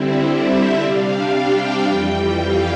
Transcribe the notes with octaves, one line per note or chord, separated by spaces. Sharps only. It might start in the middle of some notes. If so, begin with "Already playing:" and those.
Already playing: D3 G3 C4 E4
E5
C3 G3 D4 F5
G5
F2 E3 G3 G5
F5